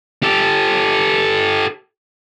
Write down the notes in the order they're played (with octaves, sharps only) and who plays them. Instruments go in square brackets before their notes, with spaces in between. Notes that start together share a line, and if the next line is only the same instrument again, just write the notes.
[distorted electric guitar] G4 A4